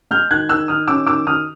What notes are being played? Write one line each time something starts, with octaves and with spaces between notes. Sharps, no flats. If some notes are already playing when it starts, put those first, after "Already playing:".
G#3 F6 G6
D#3 F#6 G#6
D#3 E6 F#6
D#3 D#6 F6
C#4 D6 E6
D#3 D6 E6
D#3 D#6 F6